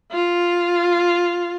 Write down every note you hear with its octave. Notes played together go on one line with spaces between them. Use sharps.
F4